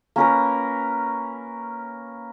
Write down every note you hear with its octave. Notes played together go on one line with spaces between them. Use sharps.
A#3 C#4 A#4 B4